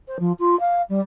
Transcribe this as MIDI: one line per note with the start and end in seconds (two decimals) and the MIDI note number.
0.08 0.17 72
0.19 0.32 53
0.39 0.58 65
0.60 0.82 77
0.89 1.00 55